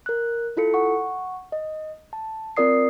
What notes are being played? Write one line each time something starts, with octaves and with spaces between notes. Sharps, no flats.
A#4 F#6
E4 F4 A4 C#7
F#5 C#6
D#5
A5
C4 F4 A#4 D5 D#6 C7